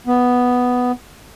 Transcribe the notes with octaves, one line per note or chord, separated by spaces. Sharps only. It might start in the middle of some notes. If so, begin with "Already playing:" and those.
B3